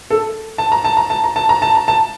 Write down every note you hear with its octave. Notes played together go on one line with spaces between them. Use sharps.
A4
A5
A#5
A5
A#5
A5
A#5
A5
A#5
A5
A#5
A5